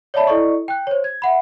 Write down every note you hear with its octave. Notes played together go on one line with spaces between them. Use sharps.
C#5 D5 E5 A5 B5
E4 A4 D5 D#5 C#6
G5 F#6
C5 C#5
G#6
E5 F#5 B5